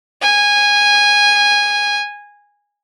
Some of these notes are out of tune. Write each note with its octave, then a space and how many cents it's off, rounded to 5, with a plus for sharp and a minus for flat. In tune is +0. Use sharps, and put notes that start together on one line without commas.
G#5 -15